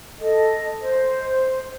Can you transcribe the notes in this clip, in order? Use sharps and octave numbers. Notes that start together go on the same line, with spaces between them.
A4 D#5
C5